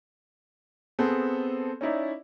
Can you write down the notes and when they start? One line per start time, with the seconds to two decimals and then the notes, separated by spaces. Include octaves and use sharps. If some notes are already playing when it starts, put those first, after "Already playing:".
0.99 B3 C4 G#4 A4
1.81 C#4 D#4 E4 D5